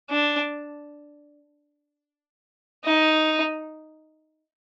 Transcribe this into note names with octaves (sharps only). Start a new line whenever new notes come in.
D4
D#4